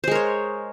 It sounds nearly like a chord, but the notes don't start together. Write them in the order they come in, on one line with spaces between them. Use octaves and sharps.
C5 G#3 A#4 C#5